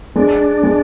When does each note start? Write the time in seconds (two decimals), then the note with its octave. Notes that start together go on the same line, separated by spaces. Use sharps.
0.16 G#3 D4
0.63 G#3